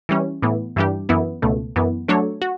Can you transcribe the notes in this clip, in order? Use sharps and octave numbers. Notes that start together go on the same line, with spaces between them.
E3 G3 C#4
A2 E3 B3
G2 E3 G3 D4 G4
F#2 E3 B3 E4
C#2 B2 A3
F#2 E3 B3
F#3 A3 D4 A4 C#5
F#4